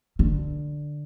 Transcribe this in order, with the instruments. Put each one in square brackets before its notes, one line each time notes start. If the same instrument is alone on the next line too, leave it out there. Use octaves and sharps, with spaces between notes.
[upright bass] D3